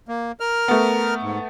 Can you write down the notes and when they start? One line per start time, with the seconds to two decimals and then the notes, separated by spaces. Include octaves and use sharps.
0.08 A#3
0.40 A#4 F6
0.68 A3 B3
1.23 G#2